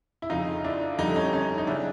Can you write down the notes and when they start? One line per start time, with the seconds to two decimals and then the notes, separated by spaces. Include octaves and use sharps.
0.22 E4
0.30 F1 F2 C#3 D#4 F4
0.64 D4 E4
0.98 F2 D3 G3 D#4
1.07 E4
1.16 C#4 D#4
1.33 C#4 D#4
1.58 D#4
1.67 C#3 F#3 D4 E4